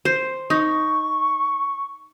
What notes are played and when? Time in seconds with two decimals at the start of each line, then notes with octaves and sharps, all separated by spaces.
0.05 C5
0.50 D#4 C#6